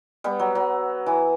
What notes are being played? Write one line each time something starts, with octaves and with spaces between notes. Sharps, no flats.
G3 B3
F#3
F#3
E3